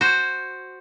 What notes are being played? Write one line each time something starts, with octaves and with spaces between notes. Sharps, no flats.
F#4 C5